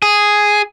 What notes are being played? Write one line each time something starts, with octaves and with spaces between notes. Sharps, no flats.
G#4